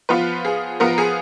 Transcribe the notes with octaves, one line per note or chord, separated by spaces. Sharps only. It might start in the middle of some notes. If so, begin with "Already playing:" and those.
F3 B3 F4 B4
G#4
F3 B3 F4 A#4
G#4